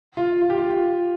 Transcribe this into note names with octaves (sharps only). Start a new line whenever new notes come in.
F4
F4
G4
F4